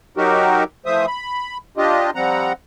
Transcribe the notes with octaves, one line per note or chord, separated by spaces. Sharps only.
F#3 D#4 F#4 G4 A#4
E3 F3 A3 C5 E5 D#6
B5
D4 F4 G4 D#5
F3 G3 C4 F#5 A#5